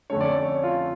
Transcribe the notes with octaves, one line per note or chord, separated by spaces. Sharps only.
F2 D3 A3 C#4 C#5
D5
C#5
F4